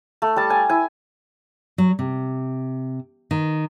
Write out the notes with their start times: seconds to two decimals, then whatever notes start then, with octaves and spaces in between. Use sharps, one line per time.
0.22 A3
0.36 G3 A5
0.50 G#5
0.69 E4 G#5
1.78 F#3
1.99 C3
3.31 D#3